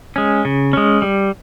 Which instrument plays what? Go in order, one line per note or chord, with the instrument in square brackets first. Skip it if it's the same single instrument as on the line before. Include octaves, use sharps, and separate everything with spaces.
[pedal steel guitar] G#3 C#4
C#3
G#3 C#4
G3